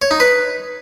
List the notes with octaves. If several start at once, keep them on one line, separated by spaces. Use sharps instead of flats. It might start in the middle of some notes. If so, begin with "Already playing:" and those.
C#5
D#4
B4